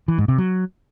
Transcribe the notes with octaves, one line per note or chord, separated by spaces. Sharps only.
E3
G#2
C3
F#3